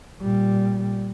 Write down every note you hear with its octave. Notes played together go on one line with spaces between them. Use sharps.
A#2 G3